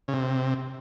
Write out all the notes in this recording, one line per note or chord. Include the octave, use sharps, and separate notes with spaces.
C#3
C3